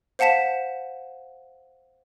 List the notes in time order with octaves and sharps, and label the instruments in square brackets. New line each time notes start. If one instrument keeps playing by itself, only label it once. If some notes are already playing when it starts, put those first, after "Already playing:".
[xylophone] C5 F5 F#5 A5 B6 E7